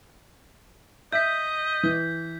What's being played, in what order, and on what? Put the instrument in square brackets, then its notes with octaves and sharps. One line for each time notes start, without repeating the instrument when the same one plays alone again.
[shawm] D#5 [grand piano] E5 [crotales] G6 B6
[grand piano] E3